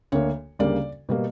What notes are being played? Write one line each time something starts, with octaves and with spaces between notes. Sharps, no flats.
D2 D3 A#3 C#5
D2 C#3 G3 A#3 D5
B2 G3 A#3